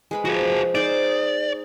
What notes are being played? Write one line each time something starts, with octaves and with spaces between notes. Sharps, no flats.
G#3 B4 B5
F3 F#4 G#4
D#4 G#4 C5 D5